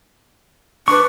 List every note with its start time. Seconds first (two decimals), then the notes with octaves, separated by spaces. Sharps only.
0.88 D4 B4 C#6